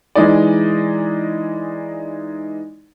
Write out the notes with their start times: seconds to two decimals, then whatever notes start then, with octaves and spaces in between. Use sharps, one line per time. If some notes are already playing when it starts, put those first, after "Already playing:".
0.15 E3 G#3 D#4 D5